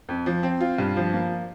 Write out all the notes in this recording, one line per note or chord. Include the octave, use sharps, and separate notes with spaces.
F2
F3
C4
F4
G2
F3
A#3